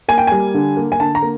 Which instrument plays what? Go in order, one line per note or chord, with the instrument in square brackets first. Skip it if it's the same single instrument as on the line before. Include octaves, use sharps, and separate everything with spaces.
[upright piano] A#3 G#5
G5
G3 G#5
D3
A#3
G#5
D3 A5
A#5
A#3